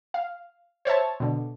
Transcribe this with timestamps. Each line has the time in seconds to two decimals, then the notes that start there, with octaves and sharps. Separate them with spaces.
0.14 F5
0.85 C5 C#5 E5 A5
1.20 B2 D3